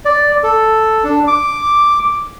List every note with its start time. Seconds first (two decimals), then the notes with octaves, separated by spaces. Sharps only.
0.05 D5
0.43 A4
1.04 D4
1.27 D6